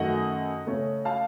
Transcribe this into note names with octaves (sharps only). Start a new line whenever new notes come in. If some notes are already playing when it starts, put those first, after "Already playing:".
Already playing: F#2 D#3 F#3 A3 D#5 F#5
C#3 A3 C#4
F5 A5